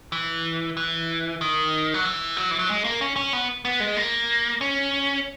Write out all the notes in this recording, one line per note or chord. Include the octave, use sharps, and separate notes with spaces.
E3
E3
D#3
F#3
E3
F#3
E3
F#3
G#3
A#3
C#4
C#4
B3
B3
G#3
A#3
C#4